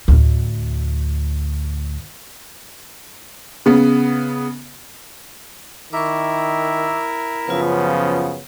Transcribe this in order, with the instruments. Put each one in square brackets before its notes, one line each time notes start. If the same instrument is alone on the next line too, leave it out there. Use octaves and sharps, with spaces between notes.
[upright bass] D2 A2
[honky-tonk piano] C#3 B3
[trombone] D#3 [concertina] E4 A#4 E5 [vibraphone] C#6 D6
[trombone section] F#2 C#3 F3 [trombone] B3 [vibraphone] F4 B4